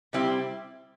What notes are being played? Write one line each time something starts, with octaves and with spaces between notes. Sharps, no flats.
C3 G3 C4 E4 G4